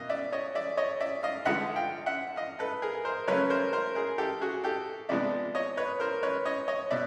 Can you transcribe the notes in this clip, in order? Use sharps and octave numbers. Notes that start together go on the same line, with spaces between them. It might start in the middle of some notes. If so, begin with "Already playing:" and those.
Already playing: B2 A#3 D#5 F5
D5 E5
C#5 D#5
D5 E5
C#5 D#5
D5 E5
D#5 F5
G2 D3 F3 G#3 E5 F#5
F5 G5
E5 F#5
D#5 F5
A4 B4
G#4 A#4
A#4 C5
C#3 F#3 A3 C#4 B4 C#5
A#4 C5
A#4 C5
G#4 A#4
G4 A4
F#4 G#4
G4 A4
C3 F3 G#3 B3 D4 D5 E5
C#5 D#5
B4 C#5
A#4 C5
B4 C#5
C#5 D#5
C#5 D#5
B2 D5 E5